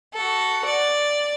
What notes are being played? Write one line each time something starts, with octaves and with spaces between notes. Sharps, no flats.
F#4 A4
D5